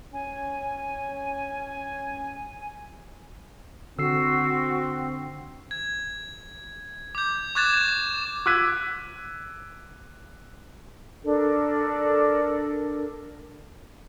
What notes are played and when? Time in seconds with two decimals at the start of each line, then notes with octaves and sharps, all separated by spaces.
0.13 C#4 G#5
3.99 D3 C4 F#4 E6 C7
5.71 G#6
7.15 D6 G6
7.55 C#6 D6 F#6 G#6 A6 E7
8.46 D6 E6 F#6 G#6 B6 D#7
11.23 D4 A4 A#4